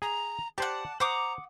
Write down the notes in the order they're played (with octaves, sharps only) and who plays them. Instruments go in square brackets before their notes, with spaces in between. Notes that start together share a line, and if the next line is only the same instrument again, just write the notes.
[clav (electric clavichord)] G#4 [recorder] A#5
[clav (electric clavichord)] G4 C5 [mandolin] D5 F#5 [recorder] A5
[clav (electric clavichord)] C5 [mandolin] F#5 D6 D#6 [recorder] A#5